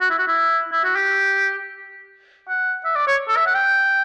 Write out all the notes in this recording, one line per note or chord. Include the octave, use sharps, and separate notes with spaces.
F#4
E4
F#4
E4
E4
F#4
G4
F#5
E5
D5
C#5
A4
E5
F#5
G5